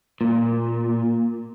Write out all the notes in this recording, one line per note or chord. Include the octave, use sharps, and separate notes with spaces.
A#2